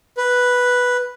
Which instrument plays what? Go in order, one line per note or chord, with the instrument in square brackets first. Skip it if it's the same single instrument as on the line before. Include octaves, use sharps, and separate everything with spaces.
[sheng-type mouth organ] B4